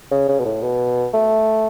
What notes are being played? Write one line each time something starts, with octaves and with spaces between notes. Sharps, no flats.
C#3
C#3
B2
A2
B2
A3